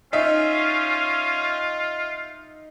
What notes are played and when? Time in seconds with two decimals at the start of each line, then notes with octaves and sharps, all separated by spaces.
0.13 C#4 D#4 F4 E5